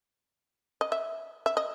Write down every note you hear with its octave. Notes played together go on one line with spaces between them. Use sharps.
D#5
E5
E5
D#5